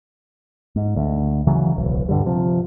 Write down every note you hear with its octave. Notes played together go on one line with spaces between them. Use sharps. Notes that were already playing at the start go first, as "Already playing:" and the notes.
G#2
D2
C#3 E3 F#3
D1 B1
G2 D3 G3
C3 F3